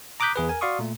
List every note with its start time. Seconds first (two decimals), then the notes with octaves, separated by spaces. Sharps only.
0.20 A#5 D6 D#6 F#6 G6 B6
0.36 E2 G#4 B4
0.49 A#4 G#5
0.61 F#4 D5 F5 C6 C#6 D#6
0.79 A#2 A3